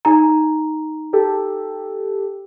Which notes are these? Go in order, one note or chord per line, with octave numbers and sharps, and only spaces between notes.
D#4 A#5
G4 A4